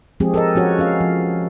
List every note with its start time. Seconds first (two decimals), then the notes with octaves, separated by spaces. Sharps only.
0.20 F3 G#3 C4 G4 G#4
0.34 A4 A#4 D#5
0.55 F3 C#4 F#4 C#5
0.79 C#4 F5
1.01 F3